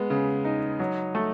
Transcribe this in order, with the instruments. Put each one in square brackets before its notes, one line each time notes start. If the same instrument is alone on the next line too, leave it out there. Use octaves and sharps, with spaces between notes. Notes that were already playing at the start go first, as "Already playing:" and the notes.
Already playing: [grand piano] G#3 B3
C#3
D#4
F#3
A3